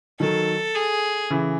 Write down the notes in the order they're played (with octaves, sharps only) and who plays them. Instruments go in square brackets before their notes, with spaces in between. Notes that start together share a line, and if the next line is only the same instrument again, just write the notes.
[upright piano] D#3 F#3 [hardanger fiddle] A4
[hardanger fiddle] G#4
[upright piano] C#3 E3